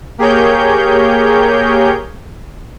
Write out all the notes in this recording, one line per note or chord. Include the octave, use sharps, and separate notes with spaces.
A#3 G4 G#4 A#4 C#5 G6